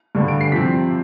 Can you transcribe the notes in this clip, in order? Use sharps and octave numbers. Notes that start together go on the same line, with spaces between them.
G2 D3 G3
D7
C7
C3 F3 C4 B6